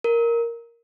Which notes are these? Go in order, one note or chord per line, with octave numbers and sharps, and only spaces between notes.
A#4